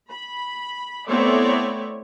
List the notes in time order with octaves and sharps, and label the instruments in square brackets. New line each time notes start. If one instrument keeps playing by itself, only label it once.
[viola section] B5
A3 B3 C4 E4 C#5 D5